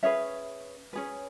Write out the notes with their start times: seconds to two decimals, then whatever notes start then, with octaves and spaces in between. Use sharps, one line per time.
0.03 C#4 G#4 B4 C#5 E5
0.93 C#4 G#4 B4